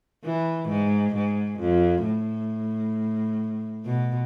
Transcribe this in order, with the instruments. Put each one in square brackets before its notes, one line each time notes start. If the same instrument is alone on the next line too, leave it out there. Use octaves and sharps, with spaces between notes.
[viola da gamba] E3
G#2
G#2
F2
A2
B2